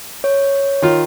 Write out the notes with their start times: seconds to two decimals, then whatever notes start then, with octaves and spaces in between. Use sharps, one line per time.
0.24 C#5
0.82 D#3 F4